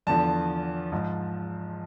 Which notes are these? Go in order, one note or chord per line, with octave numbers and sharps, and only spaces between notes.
E2 D3 F3 A5
G#2 F3